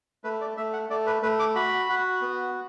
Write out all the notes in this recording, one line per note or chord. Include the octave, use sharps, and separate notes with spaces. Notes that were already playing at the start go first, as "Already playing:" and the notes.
A3 B4
D5
A3 E5
F#5
A3 D5
B4
A3 B4
D6
F#4 B5
F#4
B3